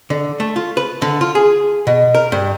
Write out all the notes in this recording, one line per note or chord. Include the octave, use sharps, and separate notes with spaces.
D3
A3
F4
B4
D3
F4
G#4
B2
A#4
G2